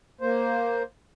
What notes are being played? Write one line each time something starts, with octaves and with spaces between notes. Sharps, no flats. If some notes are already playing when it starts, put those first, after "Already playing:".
A#3 C5